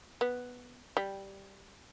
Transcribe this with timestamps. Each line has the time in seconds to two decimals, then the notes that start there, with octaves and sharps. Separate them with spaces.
0.21 B3
0.97 G3